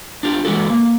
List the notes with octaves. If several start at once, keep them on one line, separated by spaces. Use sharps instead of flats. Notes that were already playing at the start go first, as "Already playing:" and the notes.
D4 F4 G4
E3 G#3 F#4 A4
A#3